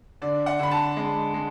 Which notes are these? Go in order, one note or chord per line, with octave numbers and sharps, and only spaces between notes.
D3 D5
F#5
D3 B5
A5
G#3
G#3